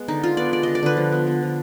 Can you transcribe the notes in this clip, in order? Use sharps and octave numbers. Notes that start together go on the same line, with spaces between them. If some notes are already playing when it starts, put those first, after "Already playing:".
Already playing: G#3 B3
D3 D#4
D3 F4
B3 D5
G#3 D5
D3 D#5
D5
D3 B4
F3
B3
B3
F3